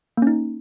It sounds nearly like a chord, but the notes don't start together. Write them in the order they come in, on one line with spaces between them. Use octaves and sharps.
A#3 C#4 D#4